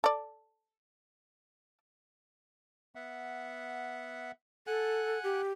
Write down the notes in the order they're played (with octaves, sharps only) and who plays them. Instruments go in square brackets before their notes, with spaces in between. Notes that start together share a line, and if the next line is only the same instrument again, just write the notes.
[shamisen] A4 D5
[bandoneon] B3 E5 F#5
[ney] A4 [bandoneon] F#5 G#5 F#6
[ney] G4